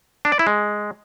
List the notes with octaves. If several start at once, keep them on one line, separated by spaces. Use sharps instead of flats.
D4
D5
E4
G#3